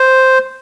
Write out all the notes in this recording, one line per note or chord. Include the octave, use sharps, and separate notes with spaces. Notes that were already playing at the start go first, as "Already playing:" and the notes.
Already playing: C5